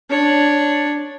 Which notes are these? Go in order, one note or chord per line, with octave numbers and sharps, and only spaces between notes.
D4 C#5